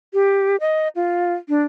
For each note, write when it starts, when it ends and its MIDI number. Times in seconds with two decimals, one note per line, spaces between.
0.14 0.56 67
0.60 0.88 75
0.96 1.33 65
1.49 1.63 62